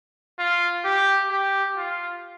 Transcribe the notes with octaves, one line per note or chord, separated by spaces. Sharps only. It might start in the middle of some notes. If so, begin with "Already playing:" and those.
F4
G4
G4
F4